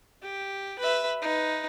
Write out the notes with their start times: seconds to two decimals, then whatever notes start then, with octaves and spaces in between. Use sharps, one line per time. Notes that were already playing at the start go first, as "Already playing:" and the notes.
0.23 G4
0.79 B4 E5
1.22 D#4 B4